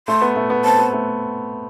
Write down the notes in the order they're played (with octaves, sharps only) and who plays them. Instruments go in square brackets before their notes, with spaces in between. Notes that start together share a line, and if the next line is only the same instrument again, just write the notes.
[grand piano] A3 [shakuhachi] C6
[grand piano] B3
A3
B3
[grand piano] C4 [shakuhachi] A5
[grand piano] B3
A3